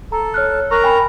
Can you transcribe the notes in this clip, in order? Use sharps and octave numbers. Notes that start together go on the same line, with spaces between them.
A4 A#5
C#5 F6 F#6
A#4 A#5 C#6 F#6 A#6
G5 G#5 B5